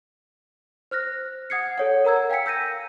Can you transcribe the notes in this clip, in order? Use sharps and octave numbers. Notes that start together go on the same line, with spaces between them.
C5 F6 F#6 A#6
F#5 D#6 G#6 C7 C#7
A4 C#5 F#5
A#4 F#5 A#5 E6 G#6
F5 G5 G#5 B6 C#7
E6 G6 A#6 D#7